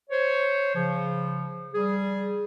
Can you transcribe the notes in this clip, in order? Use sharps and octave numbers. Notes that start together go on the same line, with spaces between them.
C5 C#5
C#3 F3
G3 G#4